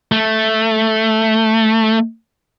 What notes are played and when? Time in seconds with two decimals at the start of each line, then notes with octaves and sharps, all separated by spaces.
0.12 A3